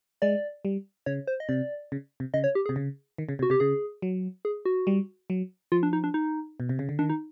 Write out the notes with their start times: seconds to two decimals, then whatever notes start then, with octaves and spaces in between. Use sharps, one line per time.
0.22 G#3 D5
0.65 G3
1.06 C#3 C#5
1.27 C5
1.40 D#5
1.49 C3 D5
1.92 C#3
2.20 C3
2.34 C#3 D#5
2.44 C#5
2.55 G4
2.66 G#4
2.69 C3
2.76 C#3
3.18 D#3
3.29 C#3
3.39 C3
3.43 F#4
3.50 C3 G4
3.60 C#3 G#4
4.02 F#3
4.45 G#4
4.65 F#4
4.87 G3
5.30 F#3
5.72 F3 F4
5.83 D4
5.93 D#4
6.04 D4
6.14 D#4
6.60 B2
6.69 C3
6.79 C#3
6.89 D3
6.99 D#3 D4
7.09 D#4